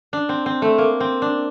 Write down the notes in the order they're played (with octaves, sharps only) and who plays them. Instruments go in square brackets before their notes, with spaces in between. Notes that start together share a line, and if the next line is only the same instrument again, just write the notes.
[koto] D4
C4
C4
A3
A#3
C4
D4